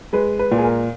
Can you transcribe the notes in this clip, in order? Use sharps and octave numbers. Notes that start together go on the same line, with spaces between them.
G#3 B4
B4
A#2
G#4
A#4